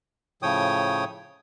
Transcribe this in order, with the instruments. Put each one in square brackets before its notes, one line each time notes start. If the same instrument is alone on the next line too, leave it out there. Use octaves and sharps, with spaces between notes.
[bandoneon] A2 C#3 F3 C#5 G5 D#6